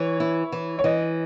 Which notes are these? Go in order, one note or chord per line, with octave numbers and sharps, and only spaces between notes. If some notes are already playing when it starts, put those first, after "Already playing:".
Already playing: E3 C#5
E4
E3
C#5
E3 D#5